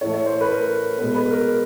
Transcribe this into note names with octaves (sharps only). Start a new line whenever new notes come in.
A2 E3 A3 C#5
C#5
C5
B4
A#4
B2 G#3 B3 B4
B4
A#4